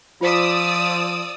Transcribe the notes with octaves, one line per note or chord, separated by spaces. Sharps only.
F3 F4 C5 D5 D#6 E6 B6